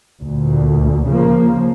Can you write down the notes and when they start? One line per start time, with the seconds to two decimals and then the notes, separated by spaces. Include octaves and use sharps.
0.22 D2 A#2
1.08 C#3 F3 A#3